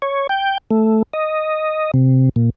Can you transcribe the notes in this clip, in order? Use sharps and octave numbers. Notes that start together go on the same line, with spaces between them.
C#5
G5
A3
D#5
C3
A#2